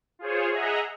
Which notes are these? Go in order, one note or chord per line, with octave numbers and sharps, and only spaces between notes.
F4 G#4 C5 C#5
G#4 D#5 E5 F#5 A#5